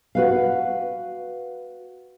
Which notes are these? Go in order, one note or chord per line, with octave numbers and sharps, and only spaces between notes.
F#4 B4 F5